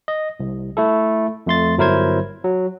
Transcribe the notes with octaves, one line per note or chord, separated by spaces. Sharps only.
D#5
C2
A3 E4 A4
F2 A3 C6 A6
G1 F#3 E4 A#4 C5 G#6
F#3